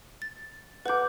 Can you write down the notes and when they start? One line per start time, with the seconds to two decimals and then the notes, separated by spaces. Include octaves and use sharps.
0.22 A6
0.86 B4 F#5 D6 G6